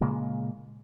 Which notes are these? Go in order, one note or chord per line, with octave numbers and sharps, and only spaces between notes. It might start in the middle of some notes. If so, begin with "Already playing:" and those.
A#2 C#3 G#3 A#3